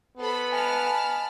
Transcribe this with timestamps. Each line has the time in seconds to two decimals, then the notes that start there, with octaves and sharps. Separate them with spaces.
0.18 B3 A4 C5 B5
0.52 D#5 F#5 G#5 A5 B5 F6